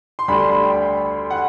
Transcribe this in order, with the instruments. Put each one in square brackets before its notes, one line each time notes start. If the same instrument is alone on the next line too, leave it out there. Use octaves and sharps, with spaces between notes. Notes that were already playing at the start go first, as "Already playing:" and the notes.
[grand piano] C6
D2 D3 G3 B5
C6
B5
G5
F#5